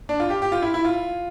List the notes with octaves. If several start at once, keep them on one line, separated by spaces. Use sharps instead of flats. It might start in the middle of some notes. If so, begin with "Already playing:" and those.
D4
F4
G4
G4
F4
E4
E4
F4